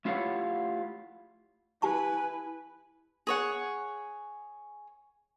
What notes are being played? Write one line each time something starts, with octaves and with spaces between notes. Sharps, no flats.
A3 E4 F4 G4 C#5 F#5
E4 G4 B4 G#5 A5 C#6
G#4 C#5 F#5